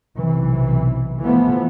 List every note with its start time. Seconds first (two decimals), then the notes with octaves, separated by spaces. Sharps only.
0.17 B1 C3 E3
1.21 E3 F3 A3 B3